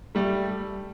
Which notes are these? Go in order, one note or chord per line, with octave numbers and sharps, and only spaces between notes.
G3 A3